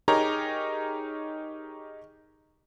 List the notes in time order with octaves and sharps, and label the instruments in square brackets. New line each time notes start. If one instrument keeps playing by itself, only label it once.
[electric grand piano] D#4 G4 G#4 A#4 C#5 A#5